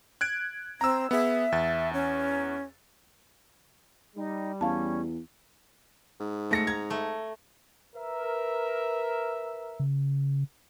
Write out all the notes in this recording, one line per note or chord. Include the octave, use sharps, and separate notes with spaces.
F#6 G#6 D7
C4 A#5 E6
B3 G#4 E5
E2 A6
C#4
G3 D#4
E2 C#4 F5 A5
G#2
A3 A#6 C#7
A#5 G#6
A3
A#4 B4 E5
C#3